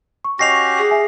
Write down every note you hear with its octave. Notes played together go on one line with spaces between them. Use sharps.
C#6
C#4 F#4 G4 D#5 C#6 A#6 C7 F7
G#4
E5 G#5